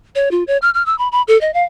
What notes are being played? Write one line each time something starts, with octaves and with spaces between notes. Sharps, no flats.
C#5
F4
C#5
F6
F6
E6
B5
B5
A4
D#5
F5